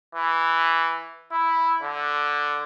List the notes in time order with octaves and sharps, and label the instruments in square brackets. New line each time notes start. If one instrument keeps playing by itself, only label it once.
[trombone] E3
E4
D3